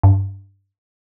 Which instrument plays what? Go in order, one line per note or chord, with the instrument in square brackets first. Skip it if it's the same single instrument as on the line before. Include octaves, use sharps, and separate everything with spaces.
[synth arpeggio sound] G2